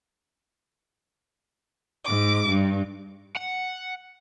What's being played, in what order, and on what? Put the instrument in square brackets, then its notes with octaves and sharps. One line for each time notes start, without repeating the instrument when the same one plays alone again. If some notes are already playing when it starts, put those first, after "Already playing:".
[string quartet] G#2 D6
G2
[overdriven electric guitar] F#5